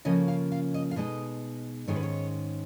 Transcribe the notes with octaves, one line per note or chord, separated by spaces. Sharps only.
C#3 F3 A#3 C#4 D#5
F5
F5
D#5
F5
B2 G#3 D#4 D#5
G#2 D#3 G#3 C#4 C#5
B4
C#5